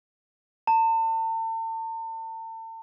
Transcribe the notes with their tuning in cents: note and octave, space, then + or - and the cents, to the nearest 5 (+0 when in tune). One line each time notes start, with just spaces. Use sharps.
A5 +40